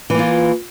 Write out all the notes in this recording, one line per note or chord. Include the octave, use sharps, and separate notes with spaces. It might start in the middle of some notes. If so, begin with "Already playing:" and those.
E3 A#3 F4